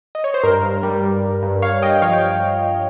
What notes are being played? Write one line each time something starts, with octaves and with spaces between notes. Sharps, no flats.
D#5
C#5
C5
G2 A#4
G2
G3
G2
G2
G2
G2 C#5 F5
G2 D#5 G5
F3 C#5 F5
G5